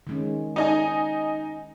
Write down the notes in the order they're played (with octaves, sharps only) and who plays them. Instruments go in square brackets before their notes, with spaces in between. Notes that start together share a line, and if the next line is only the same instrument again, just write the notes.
[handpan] D#3 G#3 C#4
[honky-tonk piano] D#4 D#5 G#5